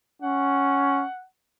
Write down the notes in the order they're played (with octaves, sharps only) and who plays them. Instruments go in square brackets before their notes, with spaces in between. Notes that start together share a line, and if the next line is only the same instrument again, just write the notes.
[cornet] C#4 [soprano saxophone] F#5